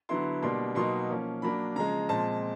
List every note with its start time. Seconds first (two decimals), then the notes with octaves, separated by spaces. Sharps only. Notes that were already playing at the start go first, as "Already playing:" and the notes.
0.09 D3 F#3 B3 E4 C6
0.42 B2 G3 A#3 D4 C6
0.75 B2 F#3 A#3 D#4 C6
1.10 F3 A#3 C#4
1.42 F#3 A#3 D4 B5
1.76 C#3 F3 G#3 A#5
2.09 A#2 F3 G#3 C4 A5